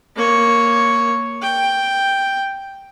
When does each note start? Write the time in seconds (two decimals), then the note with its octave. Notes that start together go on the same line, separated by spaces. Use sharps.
0.16 A#3 C#5
1.42 G5